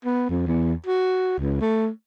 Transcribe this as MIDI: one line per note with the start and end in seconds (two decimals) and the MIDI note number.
0.05 0.28 59
0.30 0.43 41
0.47 0.73 40
0.86 1.36 66
1.39 1.58 37
1.61 1.88 57